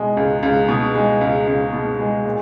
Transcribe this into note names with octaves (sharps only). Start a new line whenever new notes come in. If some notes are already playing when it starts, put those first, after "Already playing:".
Already playing: B2 G#3
C#2
C#2
B2
G#3
C#2
C#2
B2
G#3
A#2